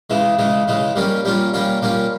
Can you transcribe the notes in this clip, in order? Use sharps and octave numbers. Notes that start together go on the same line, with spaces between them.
C#3 E3 G#3
C#3 E3 G#3
C#3 E3 G#3
G3 A#3 C#4 F4
G3 A#3 C#4 F4
G3 A#3 C#4 F4
G3 A#3 C#4 F4